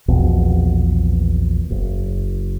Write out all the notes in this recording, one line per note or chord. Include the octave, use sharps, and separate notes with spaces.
A#1 E2 B2 C4
F#1